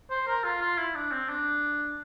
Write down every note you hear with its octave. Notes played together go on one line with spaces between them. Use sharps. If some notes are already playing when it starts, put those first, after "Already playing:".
C5
A#4
F4
F4
E4
D4
C4
D4